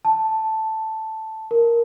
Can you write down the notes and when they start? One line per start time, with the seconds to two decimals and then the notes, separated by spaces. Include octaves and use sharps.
0.05 A5
1.51 A#4